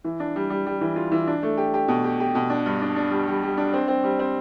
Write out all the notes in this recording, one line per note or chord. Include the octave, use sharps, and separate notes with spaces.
E3
D4
G3
G3
G3
E3
F4
E3
D4
A3
G4
G4
B2
G4
G4
B2
D4
G2
D4
D4
G3
G3
G3
D4
C4
C4
G3
C4